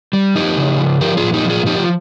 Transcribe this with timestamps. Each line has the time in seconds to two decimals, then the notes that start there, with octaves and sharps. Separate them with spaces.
0.13 G3
0.35 F3 D#4 G4
0.57 C#3
0.79 F3
1.01 F3 G4 A#4
1.17 F4 G#4
1.23 A#2
1.34 D#4 G4
1.45 F3
1.50 F4 G#4
1.66 F3 D#4 G4
1.79 F4